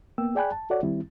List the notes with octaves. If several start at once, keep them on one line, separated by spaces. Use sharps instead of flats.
A#3 B3 G5 E6
G#4 D5 G5 G#5 B5 F#6
A5
F#4 A4 C#5 D5 F#5
D#3 G3 C4 E4